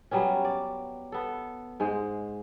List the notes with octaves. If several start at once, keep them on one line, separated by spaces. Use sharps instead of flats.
F#3 G3 B3 C#4
D5
B3 A4
G#2 G#3 C5